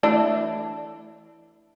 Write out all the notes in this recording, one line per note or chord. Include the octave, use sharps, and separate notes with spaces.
E3 A3 D4